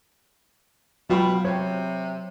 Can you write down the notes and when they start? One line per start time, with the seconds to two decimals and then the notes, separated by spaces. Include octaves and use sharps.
1.10 B2 F#3 F4 G5 B5
1.45 C3 C5 C#5